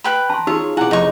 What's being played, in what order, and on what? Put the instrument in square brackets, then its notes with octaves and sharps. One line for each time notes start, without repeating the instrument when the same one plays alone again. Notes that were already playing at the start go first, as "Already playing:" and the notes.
[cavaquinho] B4 G5 B5
[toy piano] A5 C6 [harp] A#5 D7
[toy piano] D#4 F#4 E6 [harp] F4 G#4 [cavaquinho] C#5
[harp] B2 C4 G#5 [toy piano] E4 [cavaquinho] D5 F#5
[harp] F1 [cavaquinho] D#4 C#6